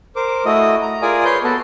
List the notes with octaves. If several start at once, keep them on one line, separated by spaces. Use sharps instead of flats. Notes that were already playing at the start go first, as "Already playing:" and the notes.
A#4 C5 D6
A3 E4 F#4 D#5 D#6
A#5
F4 G#4 A#4 D5 G#5 D#6
B4 C#5 C6 G6
B3 F#4 A4 B4 A5